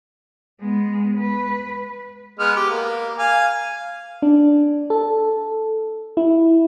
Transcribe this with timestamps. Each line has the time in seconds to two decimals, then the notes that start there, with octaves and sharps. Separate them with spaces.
0.61 G#3 B3
1.17 B4
2.40 G#3 B3 F6
2.56 G4
2.70 A#3
3.19 F5 G#5
4.22 D4
4.90 A4
6.17 E4